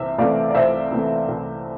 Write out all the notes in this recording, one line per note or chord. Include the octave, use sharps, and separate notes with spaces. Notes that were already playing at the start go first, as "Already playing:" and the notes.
Already playing: C2 C3 E3 C5 E5
C3 E3 A3 D5 F5
D5
C2 C5 E5
C3 E3 A3
C2